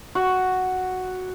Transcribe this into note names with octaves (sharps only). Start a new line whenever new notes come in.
F#4